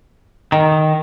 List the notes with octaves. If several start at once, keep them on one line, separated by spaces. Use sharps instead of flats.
D#3